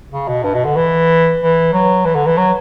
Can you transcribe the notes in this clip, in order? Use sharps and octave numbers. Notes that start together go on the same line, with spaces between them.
C#3
B2
G2
B2
D3
E3
E3
F#3
E3
D3
E3
F#3